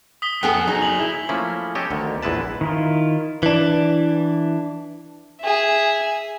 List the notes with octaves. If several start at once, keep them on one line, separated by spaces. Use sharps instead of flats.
D#6 B6 G7
F2 A#3 B3 G#4 A4 G5
F#3 D#4 G#4
D#6 F7 F#7
E4
F3 A3 A#3 C#4 E4
G4 A4 C#5 D#5
D2 D3 D#3
A#1 E2 G#3 E4 B4 A5
D#3 E4 F4
E3 D4
G#4 E5